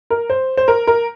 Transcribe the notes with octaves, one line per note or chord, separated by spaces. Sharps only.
A#4
C5
C5
A#4
A#4